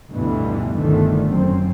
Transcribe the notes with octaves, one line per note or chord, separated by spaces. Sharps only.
D2 G2 B2 D3 E3 G3
G1 D3 D#3 A3
F#2 C4